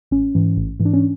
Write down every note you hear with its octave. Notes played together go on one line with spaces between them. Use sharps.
A1 C#4
G#2 E3
A1
G#2 E3
D4
C#4